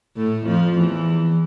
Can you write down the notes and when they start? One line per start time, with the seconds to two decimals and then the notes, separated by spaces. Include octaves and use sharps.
0.17 A2 A3
0.47 F2 F3
0.77 E2 E3